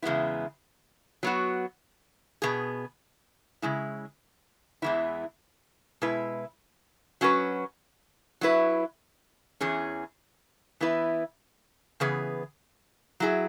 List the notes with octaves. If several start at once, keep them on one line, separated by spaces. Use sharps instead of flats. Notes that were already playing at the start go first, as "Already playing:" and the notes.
E2 C#3 G#3 B3 E4
F#3 B3 F#4
B2 B3 G#4
C#3 G#3 E4
E2 E3 G#3 B3 E4
B2 G#3 E4 B4
F#3 C#4 F#4 B4
F#3 E4 B4
E2 E3 C#4 G#4
E3 B3 E4 B4
C#3 E3 B3 G#4 B4
F#3 E4 G#4